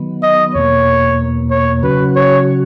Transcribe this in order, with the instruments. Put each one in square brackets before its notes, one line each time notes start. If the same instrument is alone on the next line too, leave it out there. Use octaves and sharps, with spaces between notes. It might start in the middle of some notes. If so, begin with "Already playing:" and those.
Already playing: [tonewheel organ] D#3 F#3 B3
[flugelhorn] D#5
[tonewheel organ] E2 B2 A#3 [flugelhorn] C#5
[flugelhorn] C#5
[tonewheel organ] C#3 F#3 C#4 F#4 [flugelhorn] B4
[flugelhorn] C#5